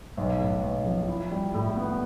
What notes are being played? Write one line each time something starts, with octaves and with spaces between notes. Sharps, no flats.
B1
A2
B1
F3
E4
G3
A2
B3